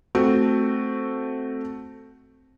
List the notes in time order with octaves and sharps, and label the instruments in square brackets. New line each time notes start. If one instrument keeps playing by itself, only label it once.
[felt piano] A3 C4 F#4